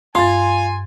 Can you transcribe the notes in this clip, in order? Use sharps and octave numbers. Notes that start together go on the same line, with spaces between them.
G2 F4 G#5 C6 A6